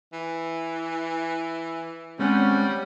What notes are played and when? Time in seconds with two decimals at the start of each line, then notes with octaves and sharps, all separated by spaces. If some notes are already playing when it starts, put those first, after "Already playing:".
0.13 E3
2.19 G3 G#3 C4 C#4 F#5